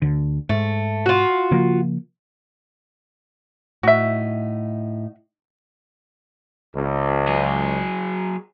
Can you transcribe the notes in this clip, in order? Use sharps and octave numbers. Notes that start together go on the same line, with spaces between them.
D2 D3
G#2 A3
F4 F#4
C#3 F3 A#3
A2 D#4 F#4 E5
C#2
F#3 G#4